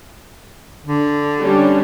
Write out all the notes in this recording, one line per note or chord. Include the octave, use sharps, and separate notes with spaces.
D3
G3 C#4 D4